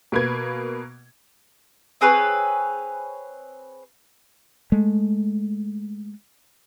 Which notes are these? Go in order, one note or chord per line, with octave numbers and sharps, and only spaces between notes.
B2 A#3 B4 G#6
C4 G#4 B4 C#5
G#3 A3